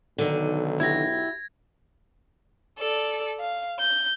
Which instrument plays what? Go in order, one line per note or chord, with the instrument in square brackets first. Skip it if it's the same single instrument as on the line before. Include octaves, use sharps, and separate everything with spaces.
[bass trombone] B1 [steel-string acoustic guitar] D3 D#3
[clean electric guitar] E4 F#4 G4 [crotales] G#6 A#6
[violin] A4 D5
F5
G6